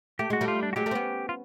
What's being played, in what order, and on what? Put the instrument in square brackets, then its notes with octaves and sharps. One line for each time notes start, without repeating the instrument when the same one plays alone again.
[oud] A3 [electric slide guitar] G4
[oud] G#3 [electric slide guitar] F#4
[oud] G3 A3
[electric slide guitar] F4
D4
F#4
[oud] F#3 G#3 [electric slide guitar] G4
[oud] G3 A3
C4
B3 C#4
[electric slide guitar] F4